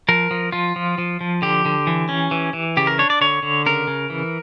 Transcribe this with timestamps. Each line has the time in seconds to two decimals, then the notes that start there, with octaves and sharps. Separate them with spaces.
0.08 F3 A#4
0.31 F3
0.52 F3 F4
0.76 F3
0.98 F3
1.21 F3
1.42 D3 G4
1.65 D3
1.87 E3
2.09 C#4
2.31 E3
2.53 E3
2.77 C#3 G4
2.87 A#4
2.99 D4 C#5
3.10 D5
3.21 D3 C#5
3.43 D3
3.66 C#3 A#4
3.87 C#3
4.10 E3